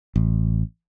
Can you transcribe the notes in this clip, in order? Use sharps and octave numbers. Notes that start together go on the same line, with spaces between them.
A1